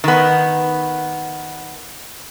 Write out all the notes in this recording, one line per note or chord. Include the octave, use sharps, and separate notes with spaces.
D#3 B3